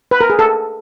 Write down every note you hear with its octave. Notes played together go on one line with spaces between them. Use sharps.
B4
A#4
G#4
A4